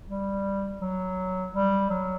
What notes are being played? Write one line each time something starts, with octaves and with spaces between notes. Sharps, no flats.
G3
F#3
G3
F#3